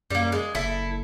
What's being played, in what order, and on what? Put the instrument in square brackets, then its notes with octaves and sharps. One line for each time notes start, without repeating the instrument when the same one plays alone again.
[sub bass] F#2 [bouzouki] G3 A#3
[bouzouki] G#3
[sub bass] F#1 [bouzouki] E4 A4